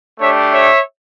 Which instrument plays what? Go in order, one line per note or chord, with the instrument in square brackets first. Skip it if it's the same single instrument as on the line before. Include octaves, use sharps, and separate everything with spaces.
[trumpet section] A3 D4 G4 C#5 E5
C#5 E5